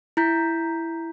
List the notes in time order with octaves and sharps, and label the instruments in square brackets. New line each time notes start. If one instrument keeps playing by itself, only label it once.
[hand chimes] E4 A#5 G6 B6